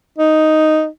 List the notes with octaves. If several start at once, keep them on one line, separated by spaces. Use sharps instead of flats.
D#4